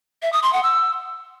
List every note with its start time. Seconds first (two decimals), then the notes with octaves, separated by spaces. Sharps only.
0.22 E5
0.33 D#6
0.43 C6
0.53 F#5
0.63 E6